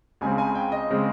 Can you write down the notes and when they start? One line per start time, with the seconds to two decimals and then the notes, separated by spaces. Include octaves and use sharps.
0.21 C#2 C#3 G#3 C4 G#5
0.38 G#5
0.55 G5
0.72 D#5
0.90 C#3 G#3 C4